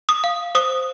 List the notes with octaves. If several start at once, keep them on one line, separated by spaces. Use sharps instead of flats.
D#6
F5
C5 D#6